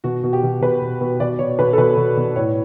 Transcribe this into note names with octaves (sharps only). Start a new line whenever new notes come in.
B2 F#4
B2
G4
B2
B2 B4
B2
B2
B2 D5
B2 C#5
B2 B4
A4
B2 B4
B2
B2
A2 C#5